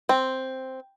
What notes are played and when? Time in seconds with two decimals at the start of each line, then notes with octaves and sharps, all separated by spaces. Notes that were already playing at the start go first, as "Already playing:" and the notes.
0.09 C4